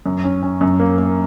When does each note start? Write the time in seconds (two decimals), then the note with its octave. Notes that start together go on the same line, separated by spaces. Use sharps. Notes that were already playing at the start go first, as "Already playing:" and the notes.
0.06 F#2
0.24 C#4
0.43 C#4
0.61 F#2
0.80 A#3
0.98 A#3